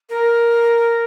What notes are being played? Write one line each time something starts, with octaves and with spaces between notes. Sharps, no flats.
A#4